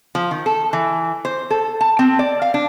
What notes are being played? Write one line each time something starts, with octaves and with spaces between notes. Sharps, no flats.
F3
D#3
A4
E3
C5
A4
A5
C4
D5
F5
D4